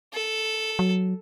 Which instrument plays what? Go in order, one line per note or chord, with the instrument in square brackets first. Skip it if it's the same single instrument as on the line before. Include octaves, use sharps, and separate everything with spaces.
[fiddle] A4
[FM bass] F#3